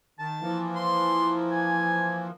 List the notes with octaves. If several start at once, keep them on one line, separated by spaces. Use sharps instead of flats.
D#3 A5
E3 F3 A#3
C6
G#5